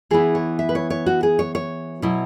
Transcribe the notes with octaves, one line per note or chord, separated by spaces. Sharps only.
E3 B3 E4 G#4
C#5
E5
B4
C#5
C#5
F#4
G#4
C#5
C#5
B2 F#3 E4